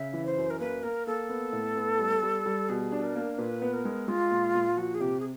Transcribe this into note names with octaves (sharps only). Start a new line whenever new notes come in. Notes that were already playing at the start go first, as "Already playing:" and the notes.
Already playing: C#3 E5
E3
C5
F#2
A#4
A#3 B4
A#3 A#4
A#3 A4
B3
A2
B3
G3
G3
G3
B2 G#4
D4
A#4
A#3
A#2 B4
B3
A#4
G#3
G#3 F4
A#2
A#2
F3 F#4
G#4
C3 G4
G#4